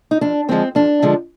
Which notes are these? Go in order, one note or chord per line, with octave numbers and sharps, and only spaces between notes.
D#4
F2 D4
D3 F3 G#3 C4
F2 D4
D3 F3 G#3